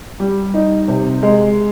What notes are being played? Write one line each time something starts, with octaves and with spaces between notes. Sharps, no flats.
G3
D#4
C3
G#3